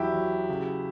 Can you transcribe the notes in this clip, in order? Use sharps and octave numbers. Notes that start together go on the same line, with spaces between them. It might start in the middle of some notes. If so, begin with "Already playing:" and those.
Already playing: E2 F#3 E4 G4
F#3
C#3